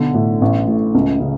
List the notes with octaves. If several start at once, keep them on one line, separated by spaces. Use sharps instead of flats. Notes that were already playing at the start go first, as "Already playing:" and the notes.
Already playing: B1 D3
A2
A1
A2
C#2
C#3